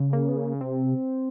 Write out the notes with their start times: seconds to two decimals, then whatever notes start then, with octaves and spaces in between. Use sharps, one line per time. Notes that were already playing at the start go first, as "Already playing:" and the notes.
Already playing: C#3
0.13 A#3
0.28 B3
0.37 A#3
0.61 C3 C4